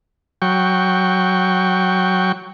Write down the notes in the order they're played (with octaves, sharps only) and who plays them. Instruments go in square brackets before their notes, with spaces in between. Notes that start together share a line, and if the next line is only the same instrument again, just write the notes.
[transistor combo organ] F#3 G5 C#6